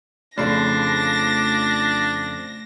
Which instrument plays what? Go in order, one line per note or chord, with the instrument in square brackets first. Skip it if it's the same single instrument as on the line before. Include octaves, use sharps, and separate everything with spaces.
[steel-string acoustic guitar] F2 C#3 F3 [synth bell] A3 C7 [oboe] D4 [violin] A#6